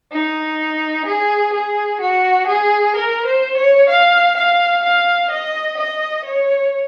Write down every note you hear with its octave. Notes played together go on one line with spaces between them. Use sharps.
D#4
G#4
G#4
F#4
G#4
A#4
C5
C#5
F5
F5
F5
D#5
D#5
C#5